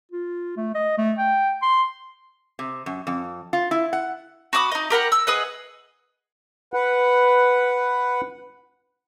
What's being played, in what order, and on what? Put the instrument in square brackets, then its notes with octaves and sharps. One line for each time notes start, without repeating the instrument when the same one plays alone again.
[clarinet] F4
A3
D#5
A3
G5
C6
[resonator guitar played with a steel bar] C3
F#2
F2
F4
E4
F#5
[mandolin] F#4 B5 D6 D#6
D#4 D#5
G4 A#4 F#5 B5
E6
G#4 B4 D#5 F#5
[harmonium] B4 F#5